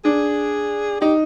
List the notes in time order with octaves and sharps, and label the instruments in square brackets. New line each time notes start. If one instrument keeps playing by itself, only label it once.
[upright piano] D4 [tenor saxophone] G#4
[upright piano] D#4 [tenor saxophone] G4